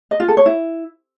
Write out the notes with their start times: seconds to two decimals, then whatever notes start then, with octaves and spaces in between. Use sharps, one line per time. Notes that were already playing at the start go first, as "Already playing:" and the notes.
0.11 D#5
0.20 F4
0.28 A4
0.37 C#5
0.46 E4